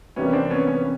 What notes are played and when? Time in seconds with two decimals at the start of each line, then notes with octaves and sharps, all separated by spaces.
0.16 F2 C3 E3 G3 A#3 B3 C#4
0.33 C4 D4
0.50 B3 C#4
0.67 B3 C#4